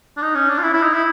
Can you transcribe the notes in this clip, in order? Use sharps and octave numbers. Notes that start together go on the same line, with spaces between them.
D4
D#4
C#4
D4
F4
E4
E4
D#4
E4